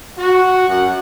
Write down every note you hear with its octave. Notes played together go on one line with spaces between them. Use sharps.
F#4
F#2 F#5